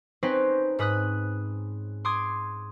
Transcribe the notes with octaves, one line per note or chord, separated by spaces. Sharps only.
C4 C#4 D#4 B4 C5
G#2 B4 D#6 F#6
C6 D6 D#6 G#6